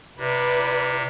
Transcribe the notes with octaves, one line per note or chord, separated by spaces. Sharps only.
C3 E4 B4 D5